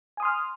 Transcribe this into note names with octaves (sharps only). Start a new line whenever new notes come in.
G#5 C6 D#6 F6